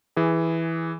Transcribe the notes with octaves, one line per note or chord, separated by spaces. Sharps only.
E3 G#4